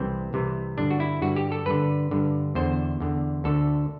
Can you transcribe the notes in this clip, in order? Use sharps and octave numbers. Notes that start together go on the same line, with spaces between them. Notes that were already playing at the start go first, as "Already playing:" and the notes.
Already playing: C2 C3 E3 C4
C2 C3 E3
G2 D3 D4
F#4
E4
G2 D3 F#4
G4
A4
G2 D3 B4
G2 D3
E2 D3 C5
E2 D3
D2 D3 A4